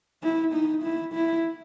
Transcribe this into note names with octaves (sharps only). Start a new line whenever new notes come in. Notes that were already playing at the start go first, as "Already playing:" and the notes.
E4
D#4
E4
E4